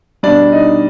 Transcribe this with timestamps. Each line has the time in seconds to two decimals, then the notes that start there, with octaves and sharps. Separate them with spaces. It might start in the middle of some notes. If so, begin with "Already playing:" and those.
0.23 B2 G3 D4 D5
0.52 D#4 D#5